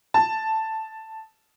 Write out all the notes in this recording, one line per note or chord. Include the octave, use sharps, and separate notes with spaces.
A5